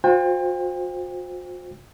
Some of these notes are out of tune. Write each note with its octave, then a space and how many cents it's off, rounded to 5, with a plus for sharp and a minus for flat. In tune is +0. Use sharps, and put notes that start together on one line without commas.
F#4 -45 C5 +0 G5 +40